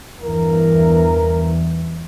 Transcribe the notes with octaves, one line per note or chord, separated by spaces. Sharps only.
E2 G2 E3 A#4